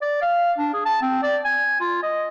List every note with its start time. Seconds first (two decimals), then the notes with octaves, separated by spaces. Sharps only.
0.02 D5
0.22 F5
0.58 D4
0.74 G#4
0.86 A5
1.02 C4
1.23 D5
1.44 G#5
1.80 F4
2.03 D#5